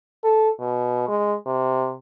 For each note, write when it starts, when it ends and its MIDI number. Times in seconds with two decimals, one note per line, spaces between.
0.24 0.50 69
0.60 1.05 47
1.08 1.35 56
1.46 1.94 48